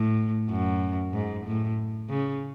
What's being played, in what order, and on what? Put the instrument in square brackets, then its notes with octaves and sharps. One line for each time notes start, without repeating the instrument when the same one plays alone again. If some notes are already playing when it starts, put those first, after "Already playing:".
Already playing: [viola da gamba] A2
F#2
G#2
A2
C#3